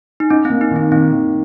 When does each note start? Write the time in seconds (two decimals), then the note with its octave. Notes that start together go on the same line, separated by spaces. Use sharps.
0.20 D#4
0.30 C#4 D#4
0.45 A#3 C4
0.61 D#4
0.71 D#3 C4
0.91 D#3 C4
1.12 D#3